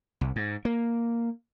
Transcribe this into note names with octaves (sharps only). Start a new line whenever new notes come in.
C2
G#2
A#3